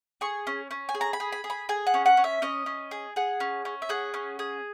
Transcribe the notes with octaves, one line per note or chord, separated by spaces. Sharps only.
G#4 C#6
C#4
C#4
G#5
G#4
A#5
B5
G#4
B5
G#4
B5
G#4 G#5
F#5
C#4
F#5
C#4
E5
C#4 D#5
C#4
G#4
G#4 F#5
C#4
C#4
E5
G#4 F#5
C#4
G#4